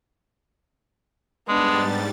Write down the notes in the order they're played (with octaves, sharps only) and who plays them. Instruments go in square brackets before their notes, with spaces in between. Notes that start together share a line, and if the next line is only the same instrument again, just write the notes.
[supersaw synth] G#2 G3 A6 [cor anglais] G#3 [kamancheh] B3 D4